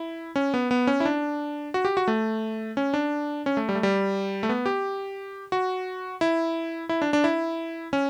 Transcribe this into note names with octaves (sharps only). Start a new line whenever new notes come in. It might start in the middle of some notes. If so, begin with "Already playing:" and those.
Already playing: E4
C#4
B3
B3
C#4
E4
D4
F#4
G4
F#4
A3
C#4
D4
C#4
A3
G3
A3
G3
A3
B3
G4
F#4
E4
E4
D4
D4
E4
C#4